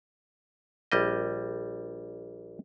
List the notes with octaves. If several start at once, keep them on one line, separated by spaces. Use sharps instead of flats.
A#1 G3 D#5